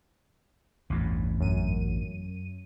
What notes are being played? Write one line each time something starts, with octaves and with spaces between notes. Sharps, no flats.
A1 E2 G2
F#2 D#7